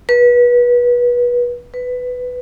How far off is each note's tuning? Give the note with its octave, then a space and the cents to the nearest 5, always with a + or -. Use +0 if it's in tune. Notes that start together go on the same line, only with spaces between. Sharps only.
B4 -25
B4 +10